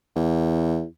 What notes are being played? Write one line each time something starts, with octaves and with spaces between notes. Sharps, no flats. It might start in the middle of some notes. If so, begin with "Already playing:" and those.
E2